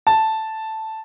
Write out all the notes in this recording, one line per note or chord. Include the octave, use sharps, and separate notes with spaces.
A5